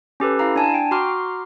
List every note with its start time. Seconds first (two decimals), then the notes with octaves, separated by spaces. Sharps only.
0.20 C#4 G4 A4 B4
0.39 E4 F5 A#5
0.56 D4 G#5 A5
0.74 G5
0.91 F#4 A#5 C6 D6 F6